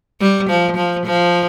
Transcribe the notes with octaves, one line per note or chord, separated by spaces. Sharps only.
G3
F3
F3
F3